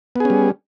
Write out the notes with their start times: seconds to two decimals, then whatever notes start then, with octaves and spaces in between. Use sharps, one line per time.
0.16 B3
0.20 G#4
0.25 C#4
0.30 G3